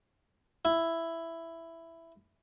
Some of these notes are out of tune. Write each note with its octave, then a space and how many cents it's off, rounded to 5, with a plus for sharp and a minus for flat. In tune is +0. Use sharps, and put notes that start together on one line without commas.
E4 +5